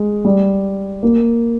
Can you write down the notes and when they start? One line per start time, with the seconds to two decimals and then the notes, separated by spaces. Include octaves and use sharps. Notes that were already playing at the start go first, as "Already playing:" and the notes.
Already playing: G#3
0.25 G3
1.03 A#3